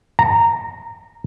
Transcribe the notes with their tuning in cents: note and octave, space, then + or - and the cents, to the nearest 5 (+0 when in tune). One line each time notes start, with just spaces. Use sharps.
A#5 -10